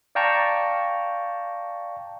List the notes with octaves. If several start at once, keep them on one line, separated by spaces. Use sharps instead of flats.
D5 F5 G5 A5 A#5 C#6